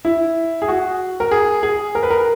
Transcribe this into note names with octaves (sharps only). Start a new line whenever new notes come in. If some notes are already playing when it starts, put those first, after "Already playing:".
E4
G#4
F#4
A#4
G#4
G#4
A#4
B4
A#4